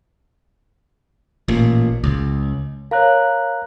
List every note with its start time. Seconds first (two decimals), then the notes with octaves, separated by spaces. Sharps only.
1.48 A1 A#2
2.04 C#2
2.91 A#4 C#5 F5 A#5 F#6